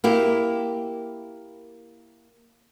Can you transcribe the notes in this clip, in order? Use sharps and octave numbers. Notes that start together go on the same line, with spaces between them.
A#3 E4 G4